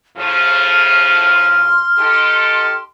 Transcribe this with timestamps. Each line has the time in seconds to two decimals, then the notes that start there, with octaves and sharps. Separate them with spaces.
0.17 A2 C#3 F3 F6
1.34 C6
1.99 D#4 G4 A4